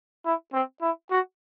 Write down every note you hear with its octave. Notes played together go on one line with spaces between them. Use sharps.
E4
C4
E4
F#4